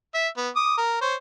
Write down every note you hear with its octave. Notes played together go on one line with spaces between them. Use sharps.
E5
B3
D6 D#6
A#4
C5 C#5